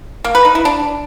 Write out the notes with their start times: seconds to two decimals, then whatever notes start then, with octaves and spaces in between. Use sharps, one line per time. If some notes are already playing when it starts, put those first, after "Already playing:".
0.24 A#3
0.35 B4
0.45 D#4
0.55 E4
0.65 D4